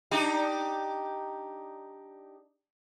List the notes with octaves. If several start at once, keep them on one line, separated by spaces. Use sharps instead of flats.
D4 D#4 G4